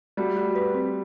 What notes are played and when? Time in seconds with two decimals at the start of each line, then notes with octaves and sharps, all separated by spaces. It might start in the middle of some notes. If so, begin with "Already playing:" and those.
0.17 G3 A3 F#4
0.36 F#4
0.55 B4
0.74 C4